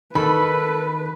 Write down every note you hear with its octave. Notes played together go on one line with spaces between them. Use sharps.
D#3 A4 B4 B5